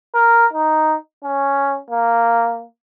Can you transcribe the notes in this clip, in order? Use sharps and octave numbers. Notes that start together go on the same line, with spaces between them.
A#4
D#4
C#4
A#3